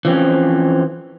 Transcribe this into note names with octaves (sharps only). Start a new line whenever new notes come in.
E3 F3 C4 C#4